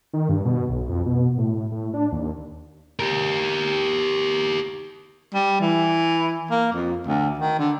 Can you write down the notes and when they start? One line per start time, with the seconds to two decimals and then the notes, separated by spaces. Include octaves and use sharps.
0.13 D#3
0.29 G2
0.45 B2
0.69 B1
0.89 F2
1.06 B2
1.38 A2
1.71 A2
1.94 D4
2.12 D#2
2.99 G4 A#4
5.34 G3
5.61 E3
6.50 A#3
6.73 F2
7.07 D2
7.39 D#3
7.59 D3